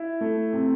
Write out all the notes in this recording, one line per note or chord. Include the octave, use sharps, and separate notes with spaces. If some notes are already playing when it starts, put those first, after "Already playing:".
Already playing: E4
A3
C3